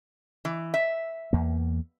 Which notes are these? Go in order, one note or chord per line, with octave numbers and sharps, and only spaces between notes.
E3
E5
E2 A#3